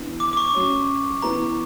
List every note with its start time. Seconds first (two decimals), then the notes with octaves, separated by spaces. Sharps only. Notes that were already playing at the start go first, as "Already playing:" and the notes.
Already playing: E3 B3 D4
0.20 D6
0.33 D6
0.37 C#6
0.54 F#3 C#4 F#4 C#5
1.22 E3 B3 E4 B4 A#5